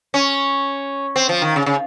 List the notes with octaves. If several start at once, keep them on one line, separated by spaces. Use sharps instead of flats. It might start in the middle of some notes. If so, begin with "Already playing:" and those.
C#4
C4
F3
D#3
C#3
C#3